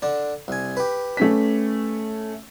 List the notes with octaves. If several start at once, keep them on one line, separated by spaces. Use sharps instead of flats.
D3 D4
C2 G#5
G4 B4
A3 C#4 B6